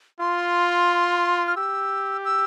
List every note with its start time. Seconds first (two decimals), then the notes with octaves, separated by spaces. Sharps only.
0.20 F4 C6
1.47 F6
1.56 G4 E6
2.25 E6